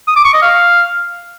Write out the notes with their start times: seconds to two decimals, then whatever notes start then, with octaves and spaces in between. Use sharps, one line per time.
0.07 D#6
0.16 D6
0.25 C#6
0.33 D#5
0.42 F5